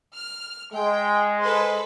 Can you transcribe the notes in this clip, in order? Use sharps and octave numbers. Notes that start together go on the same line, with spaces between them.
F6
G#3 G5
A4 B4 C5